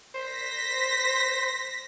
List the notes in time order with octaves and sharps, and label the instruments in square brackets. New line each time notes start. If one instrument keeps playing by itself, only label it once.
[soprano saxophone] C5 [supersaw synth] A#6 B6